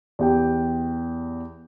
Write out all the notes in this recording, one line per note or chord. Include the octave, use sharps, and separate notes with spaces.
E2 G4 G5